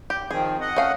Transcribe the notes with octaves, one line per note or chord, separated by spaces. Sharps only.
G4
D#3 F3 C4 G#4
D#5 F#5
A3 C#4 F5